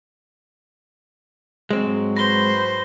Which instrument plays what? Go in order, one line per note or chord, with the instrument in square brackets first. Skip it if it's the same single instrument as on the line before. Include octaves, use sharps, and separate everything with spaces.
[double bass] G#2 F#3 [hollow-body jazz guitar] G#3 C4
[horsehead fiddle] B4 C5 [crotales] A#6 G7